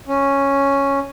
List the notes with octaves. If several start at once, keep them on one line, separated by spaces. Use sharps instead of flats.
C#4